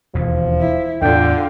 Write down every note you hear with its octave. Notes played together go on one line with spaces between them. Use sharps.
E1 D#2 F3
E4
E2 A2 D3 D4 F4 G5